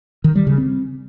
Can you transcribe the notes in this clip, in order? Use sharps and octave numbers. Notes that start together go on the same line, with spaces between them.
D#3
G3
C#3
C4